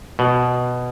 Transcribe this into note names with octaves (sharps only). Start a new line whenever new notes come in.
B2